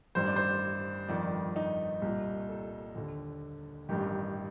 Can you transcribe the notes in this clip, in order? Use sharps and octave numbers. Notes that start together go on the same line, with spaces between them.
A1 G2 D#3 C5
D5
C5
G1 F2 D#3 D5
D#4
C2 A#2
A4
D#2 D3
A1 G2 D#3 G4